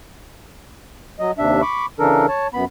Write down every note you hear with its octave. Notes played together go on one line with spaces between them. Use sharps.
F#3 D#5
D#2 C3 D4 E5
B5 C#6 D6
C#3 E3 D4 A4 A#4
C#5 A5
F#2 B3 B5